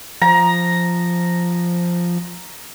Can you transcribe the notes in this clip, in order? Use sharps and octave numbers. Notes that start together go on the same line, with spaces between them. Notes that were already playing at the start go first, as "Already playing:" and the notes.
F3 A#5